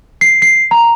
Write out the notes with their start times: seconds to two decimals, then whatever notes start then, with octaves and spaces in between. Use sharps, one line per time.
0.21 C7
0.42 C7
0.71 A#5